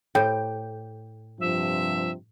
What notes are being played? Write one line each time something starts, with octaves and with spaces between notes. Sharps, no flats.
A2 G5
G2 C3 F3 E5